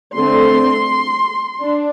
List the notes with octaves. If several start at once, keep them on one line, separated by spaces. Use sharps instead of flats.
D3 A3 C4 C6
D4